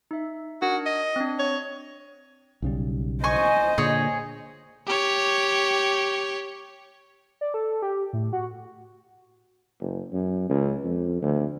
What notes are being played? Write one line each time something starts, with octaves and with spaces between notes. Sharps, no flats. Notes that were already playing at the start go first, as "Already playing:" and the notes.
D#4 E5
D4 F#4 A#4
D#5
C4 D4
C#5
B1 C#3 G3
C5 D#5 G#5 C#6
A#2 D3 G#4 C#5
G4 C#5
D5
A4
G4
A2
F#4
F#1
F#2
C#2
F2
D2